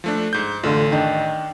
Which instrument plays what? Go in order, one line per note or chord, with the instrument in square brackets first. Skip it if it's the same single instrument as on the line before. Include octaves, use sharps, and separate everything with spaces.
[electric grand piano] F3 A3 D4
G#2 G6
[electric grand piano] A1 [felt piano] D3 A3 F4
[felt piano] D#3 D4